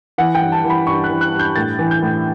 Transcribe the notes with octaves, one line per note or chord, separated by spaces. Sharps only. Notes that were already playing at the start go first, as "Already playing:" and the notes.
E3 F#5
G5
G2
A5
E3
B5
G2 C#6
F#6
E3
F#6
G2
G6
A2 A6
E3
G6
A2